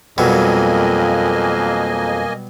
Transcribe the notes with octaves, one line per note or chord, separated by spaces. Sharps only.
F2 B2 F#3 G3 A#3 D#5 G#5